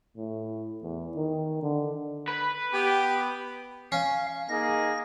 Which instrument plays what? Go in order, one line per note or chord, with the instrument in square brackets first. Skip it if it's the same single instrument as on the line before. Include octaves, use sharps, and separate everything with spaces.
[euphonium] A2
E2
D#3
D3
[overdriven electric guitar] B4
[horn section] B3 G4
[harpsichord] C#4 [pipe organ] F5
[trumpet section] A#3 D#4 G#4 [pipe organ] A#6